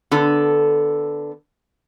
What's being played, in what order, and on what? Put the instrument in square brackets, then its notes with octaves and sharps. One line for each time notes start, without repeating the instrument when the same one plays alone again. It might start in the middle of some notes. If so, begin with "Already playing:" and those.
[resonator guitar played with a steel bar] D3 B3 A4